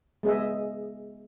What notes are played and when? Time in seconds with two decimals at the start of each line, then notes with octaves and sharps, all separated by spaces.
0.23 G#3 B3 G#4 D#5 E5